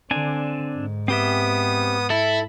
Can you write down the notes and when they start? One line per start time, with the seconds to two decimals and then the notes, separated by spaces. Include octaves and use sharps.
0.11 D3 C4 D4 G#5
0.75 G#2
1.08 B3 C4 G4 E5 D#6
2.10 E4 A4